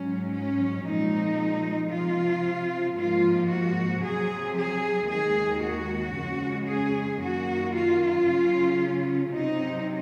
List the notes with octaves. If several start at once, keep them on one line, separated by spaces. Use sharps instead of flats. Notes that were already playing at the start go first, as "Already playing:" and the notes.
Already playing: G#2 F#3 C#4
C#4
A#2 F3 G#3 C4 D#4
C3 F3 C4 F4
G#2 F3 A#3 F4
F#4
C3 F#3 C4 G#4
G#4
D#2 D#3 G#3 G#4
F#4
F2 C#3 G#3 C#4
G#4
F#2 D#3 A#3 F#4
F4
C#3 F#3 C#4
C3 F#3 C4 D#4